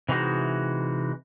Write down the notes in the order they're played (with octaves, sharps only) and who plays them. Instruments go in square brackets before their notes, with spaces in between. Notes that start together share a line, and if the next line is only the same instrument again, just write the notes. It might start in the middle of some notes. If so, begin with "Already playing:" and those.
[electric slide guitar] C3 E3 G#3 D#4 F#4